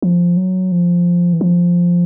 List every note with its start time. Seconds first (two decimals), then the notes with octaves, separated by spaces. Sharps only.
0.02 F3
0.37 F#3
0.72 F3
1.33 E3
1.41 F3